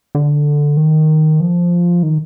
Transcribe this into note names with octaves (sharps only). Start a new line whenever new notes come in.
D3
D#3
F3
D#3